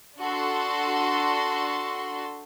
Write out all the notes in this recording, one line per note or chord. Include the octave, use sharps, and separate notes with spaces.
D4 F#4 A4 C6